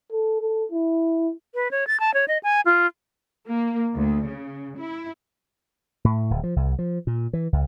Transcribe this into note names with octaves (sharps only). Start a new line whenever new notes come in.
A4
A4
E4
B4
C#5
A6
A5
C#5
D#5
G#5
F4
A#3
D2
C#3
E4
A2
D1
F3
C2
F3
A#2
E3
C#2